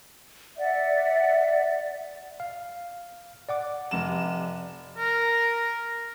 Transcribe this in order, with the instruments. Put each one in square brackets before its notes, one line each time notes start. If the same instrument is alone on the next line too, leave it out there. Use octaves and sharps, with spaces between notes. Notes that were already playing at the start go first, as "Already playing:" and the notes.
[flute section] D5 E5 F#5
[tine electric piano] F5
D5 F#5 D6
[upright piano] F1 E7
[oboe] A#4